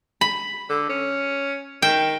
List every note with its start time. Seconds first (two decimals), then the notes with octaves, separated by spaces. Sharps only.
0.21 B5
0.69 D3
0.89 C#4
1.82 D#3 G5